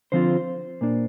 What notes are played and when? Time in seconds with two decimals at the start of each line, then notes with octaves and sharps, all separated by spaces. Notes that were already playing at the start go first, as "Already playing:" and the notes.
0.12 D3 F3 C4 F4 C5
0.81 A#2 A#3 D4